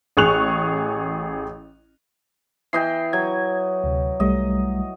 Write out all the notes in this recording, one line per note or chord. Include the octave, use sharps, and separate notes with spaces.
A1 G#4 C#6 F#6 F7
E3 D#5 G5 C7
F#3 G#6
D2 C3
C2 G3 A3 D#5